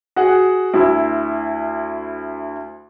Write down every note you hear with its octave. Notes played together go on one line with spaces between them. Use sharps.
F#4 G#4 F#5
D2 E4